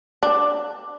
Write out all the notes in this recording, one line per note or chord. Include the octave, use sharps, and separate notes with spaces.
D4